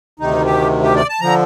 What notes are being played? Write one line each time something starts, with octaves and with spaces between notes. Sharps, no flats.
D2 C3 D#3 D#4
G4
G4
D5
A5
D3 F3 A#5